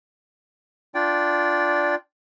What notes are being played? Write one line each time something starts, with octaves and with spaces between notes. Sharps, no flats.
D4 F4 D5 G5